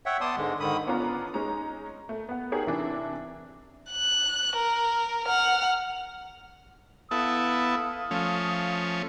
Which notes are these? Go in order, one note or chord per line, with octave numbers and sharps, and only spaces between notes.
C#5 E5 F#5 G5
B3 D5 A5 C6 D#6
G#2 D3 G#3
G#2 D3 D#3 B5 D#6
B3 C#4 D4 F4 A#5
G#3 C#4 D#4 A#5
A3
B3 F#5
D#4 G4 G#4 A#4 C#5
C3 E3 D4 E4
F#6
A#4
F#5 F6
B3 E4 A4 F5 D#6
F3 A3 C#4